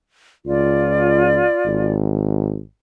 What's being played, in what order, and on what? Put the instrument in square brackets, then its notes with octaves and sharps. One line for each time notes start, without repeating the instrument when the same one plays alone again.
[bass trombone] C#2 [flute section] F4 D5
[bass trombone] G#1